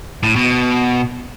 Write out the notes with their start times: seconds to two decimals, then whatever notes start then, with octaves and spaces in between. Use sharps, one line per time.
0.23 A2
0.36 B2